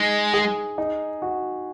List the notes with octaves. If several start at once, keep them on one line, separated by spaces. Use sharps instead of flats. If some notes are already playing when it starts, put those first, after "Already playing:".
Already playing: G#3 D#4
G#4
D#4
F#4